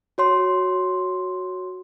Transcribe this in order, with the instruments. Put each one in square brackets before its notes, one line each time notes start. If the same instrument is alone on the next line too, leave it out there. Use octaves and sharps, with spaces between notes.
[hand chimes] F#4 C#5 C6